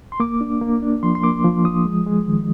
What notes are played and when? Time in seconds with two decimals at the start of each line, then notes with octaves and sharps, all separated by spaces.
0.12 C6
0.20 A#3 D6
0.41 D4
0.61 A#3
0.82 D4
1.03 F3 C6
1.15 C6
1.23 A#3 D6
1.44 F3
1.64 F3 D#6
1.85 G#3
2.07 G#3
2.27 D#3